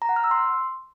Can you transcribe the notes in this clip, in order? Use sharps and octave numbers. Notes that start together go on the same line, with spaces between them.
A#5
F#5
F6
E6
C6